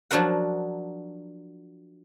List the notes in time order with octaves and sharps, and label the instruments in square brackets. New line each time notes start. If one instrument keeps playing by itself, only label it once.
[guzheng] F3 F#3 D4 F#4 A#4 F#5